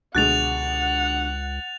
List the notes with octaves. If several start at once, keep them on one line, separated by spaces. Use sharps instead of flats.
C#2 B2 D3 G#3 F#5 F#6 A6 F7